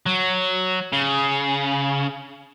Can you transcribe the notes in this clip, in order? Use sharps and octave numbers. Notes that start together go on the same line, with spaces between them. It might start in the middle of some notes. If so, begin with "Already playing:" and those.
F#3
C#3